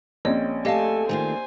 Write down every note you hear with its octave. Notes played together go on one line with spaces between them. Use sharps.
A#1 C4 C#4 C#5 D#5
A3 G4 A4 D#5 F5 G#5 A5
D#3 A3 F4 C5 G#5